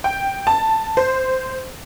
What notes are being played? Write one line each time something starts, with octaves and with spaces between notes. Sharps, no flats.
G5
A5
C5